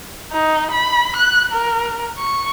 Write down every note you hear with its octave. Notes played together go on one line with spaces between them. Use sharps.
D#4
B5
F#6
A#4
C#6